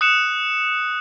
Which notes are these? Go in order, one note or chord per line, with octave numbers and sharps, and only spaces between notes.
D#6 F#6 C#7 E7